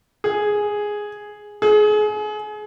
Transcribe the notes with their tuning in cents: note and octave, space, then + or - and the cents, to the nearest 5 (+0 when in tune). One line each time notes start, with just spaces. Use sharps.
G#4 +0
G#4 +30